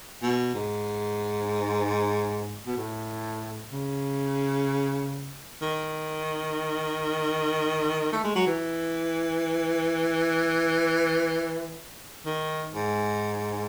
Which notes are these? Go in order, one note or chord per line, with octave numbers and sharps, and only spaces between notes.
B2
G#2
B2
A2
C#3
D#3
A3
G#3
F#3
E3
D#3
G#2